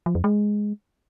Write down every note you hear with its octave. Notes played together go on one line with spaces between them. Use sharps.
F3
F2
G#3